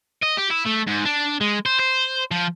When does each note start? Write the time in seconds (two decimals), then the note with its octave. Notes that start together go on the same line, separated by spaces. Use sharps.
0.22 D#5
0.37 G4
0.50 E4
0.66 A3
0.87 G#2
1.05 D4
1.41 G#3
1.66 C5
1.80 C5
2.31 F3